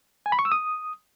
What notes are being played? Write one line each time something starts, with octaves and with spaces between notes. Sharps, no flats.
G#5
B5
C#6
E6
D#6